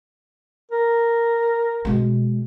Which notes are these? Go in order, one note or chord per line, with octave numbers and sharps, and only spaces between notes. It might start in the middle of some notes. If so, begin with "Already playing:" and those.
A#4
B2 G#3